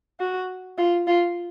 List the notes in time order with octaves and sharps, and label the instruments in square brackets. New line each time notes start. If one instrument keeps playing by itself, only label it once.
[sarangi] F#4
F4
F4